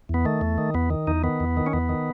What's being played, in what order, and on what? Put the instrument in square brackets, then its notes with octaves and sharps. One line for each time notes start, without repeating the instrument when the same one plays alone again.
[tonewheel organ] E2 B3
D#3 A3
E2
D#3
E2 B3
D#3
E2 D#4
D#3 B3
E2
D#3
C#4
E2 B3
D#3